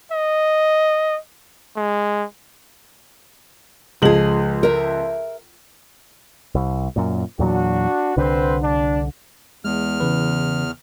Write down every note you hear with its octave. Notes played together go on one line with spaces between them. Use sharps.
D#5
G#3
C#2 F3 G#3 G#4 F#7
A#4 E5
C2
F#2 A#2
E2 A#2 F#3 D4 F#4
C2 D3 C4 B4 C5
D4
E2 G#3 F6
C#3 E3 B4